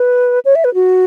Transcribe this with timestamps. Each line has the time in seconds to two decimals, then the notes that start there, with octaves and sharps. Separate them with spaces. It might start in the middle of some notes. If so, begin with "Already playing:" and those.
Already playing: B4
0.45 C#5
0.55 E5
0.64 B4
0.74 F#4